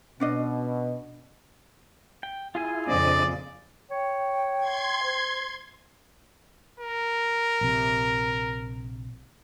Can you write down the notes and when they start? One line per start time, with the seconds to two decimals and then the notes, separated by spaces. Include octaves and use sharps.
0.20 B2 C#4 D4 D#5
2.23 G5
2.55 E4 F4 G#4 G#5
2.87 F2 A#2 C#3 C4 D4 D5 D#5
3.90 C#5 G5
4.60 C6 G#6
5.03 C5
6.80 A#4
7.61 A#1 C3